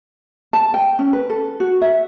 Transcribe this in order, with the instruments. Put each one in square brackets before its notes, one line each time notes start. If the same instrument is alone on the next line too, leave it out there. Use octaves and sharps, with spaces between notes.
[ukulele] A5
G5
C#4
B4
A4
F#4
E5